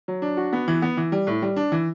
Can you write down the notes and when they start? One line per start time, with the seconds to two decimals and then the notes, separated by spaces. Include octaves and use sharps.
0.08 F#3
0.22 D4
0.37 F#4
0.53 B3
0.68 E3
0.82 B3
0.97 E3
1.12 G3
1.27 A2
1.42 G3
1.56 D4
1.72 E3